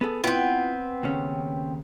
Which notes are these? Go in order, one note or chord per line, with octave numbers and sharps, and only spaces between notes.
B3 G#4 A4
B3 C4 E4 F4 G5
D#2 C#3 C#4